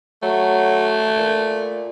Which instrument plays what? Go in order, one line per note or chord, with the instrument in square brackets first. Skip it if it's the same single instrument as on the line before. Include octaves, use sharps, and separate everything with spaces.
[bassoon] F#3 [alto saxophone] A3
[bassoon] A#2